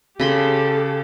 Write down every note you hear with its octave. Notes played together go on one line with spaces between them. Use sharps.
C#3 G4 A4 B5 C6